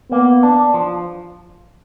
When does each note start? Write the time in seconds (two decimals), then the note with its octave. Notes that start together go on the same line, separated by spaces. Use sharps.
0.11 A#3 B3
0.43 D4
0.74 F3